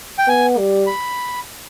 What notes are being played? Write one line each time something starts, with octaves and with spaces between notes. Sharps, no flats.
G5
B3 G#5
G3
B5